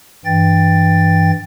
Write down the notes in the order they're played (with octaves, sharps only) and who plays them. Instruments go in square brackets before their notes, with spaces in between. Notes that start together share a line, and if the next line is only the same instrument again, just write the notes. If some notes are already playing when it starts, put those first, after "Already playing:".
[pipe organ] G2 E3 G5 A6